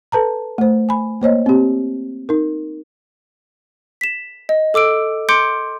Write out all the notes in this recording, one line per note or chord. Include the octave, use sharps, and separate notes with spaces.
A4 B4 A5 A#5
A3 C5
G#5 B5
A#3 C5 C#5 D#5
C4 G4
D#4 A#4
B6 E7
D#5
A4 D6 E6 D7
C6 D6 G6 C#7 D7